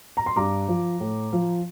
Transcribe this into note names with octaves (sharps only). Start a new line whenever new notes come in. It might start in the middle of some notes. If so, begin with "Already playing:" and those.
A#5
C6
G2 A#5 D6
F3
A2
F3